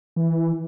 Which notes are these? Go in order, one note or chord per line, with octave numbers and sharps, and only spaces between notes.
E3